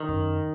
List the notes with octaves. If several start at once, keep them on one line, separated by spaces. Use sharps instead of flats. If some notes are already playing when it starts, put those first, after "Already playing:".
Already playing: D#3
F#2